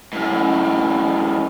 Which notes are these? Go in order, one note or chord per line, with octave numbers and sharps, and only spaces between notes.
F#2 A2